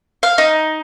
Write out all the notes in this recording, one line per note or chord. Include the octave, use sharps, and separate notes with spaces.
F5
D#4